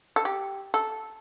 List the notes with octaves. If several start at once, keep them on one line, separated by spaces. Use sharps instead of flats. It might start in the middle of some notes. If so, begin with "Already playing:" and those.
A4
G4
A4